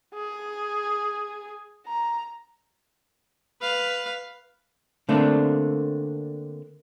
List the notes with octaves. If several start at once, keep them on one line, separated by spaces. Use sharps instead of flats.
G#4
A#5
B4 F5
D3 A3 A#3 C4 D4